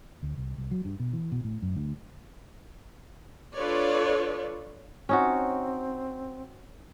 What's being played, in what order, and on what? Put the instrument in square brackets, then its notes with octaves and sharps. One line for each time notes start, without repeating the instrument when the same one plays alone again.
[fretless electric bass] D2
C2
C2
F#3
G2
B2
E3
B2
A2
F#2
D2
[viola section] D4 F4 A4 B4 C#5 D5
[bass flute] C4 [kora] C#4 D#4 F#4